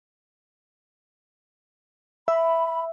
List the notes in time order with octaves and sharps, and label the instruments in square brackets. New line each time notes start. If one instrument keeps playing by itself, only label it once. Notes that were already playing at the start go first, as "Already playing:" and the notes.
[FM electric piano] E5 [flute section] B5